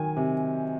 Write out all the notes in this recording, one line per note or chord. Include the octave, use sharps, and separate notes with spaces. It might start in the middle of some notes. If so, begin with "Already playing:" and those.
Already playing: D#3 F#3 G#5
C3